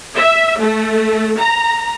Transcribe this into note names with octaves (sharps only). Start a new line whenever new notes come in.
E5
A3
A#5